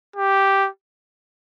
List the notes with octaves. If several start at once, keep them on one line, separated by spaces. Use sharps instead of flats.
G4